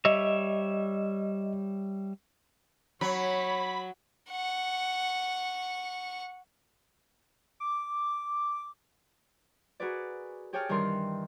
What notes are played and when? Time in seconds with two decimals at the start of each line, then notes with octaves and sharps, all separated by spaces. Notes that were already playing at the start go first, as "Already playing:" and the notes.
0.05 G3 C#5 D#5 E5
3.01 F#3 C#5 B5
4.31 F#5 C#6
7.60 D6
9.80 F#4 G#4 A#4 B4 D5
10.53 G4 G#4 C#5 G5 A5 F6
10.69 G2 D#3 E3 G3 A#4 C6